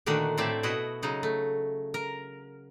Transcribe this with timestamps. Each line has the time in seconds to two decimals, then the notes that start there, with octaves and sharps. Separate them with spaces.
0.06 A#2 D3 D#3 A3 D4 F#4
0.38 A2 A3 C4 D5 E5
0.63 B2 E4 F#4 D#5
1.03 C#3 F#3 D#4
1.23 A3
1.94 A#4